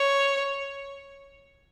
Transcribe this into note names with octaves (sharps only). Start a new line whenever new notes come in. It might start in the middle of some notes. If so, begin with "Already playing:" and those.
Already playing: C#5